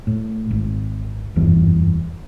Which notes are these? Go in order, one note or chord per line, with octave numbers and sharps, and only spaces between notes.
A2
G#1
F#1 E2 G2 E3